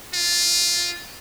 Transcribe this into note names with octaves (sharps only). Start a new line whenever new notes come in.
F4